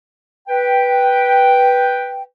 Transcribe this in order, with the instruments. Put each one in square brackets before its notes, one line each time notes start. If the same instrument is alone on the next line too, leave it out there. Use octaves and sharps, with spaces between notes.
[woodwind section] B4 G5